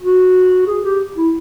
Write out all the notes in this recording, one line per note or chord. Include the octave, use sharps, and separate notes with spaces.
F#4
G#4
G4
E4